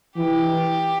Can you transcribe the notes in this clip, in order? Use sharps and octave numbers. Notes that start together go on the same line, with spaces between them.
E3 G4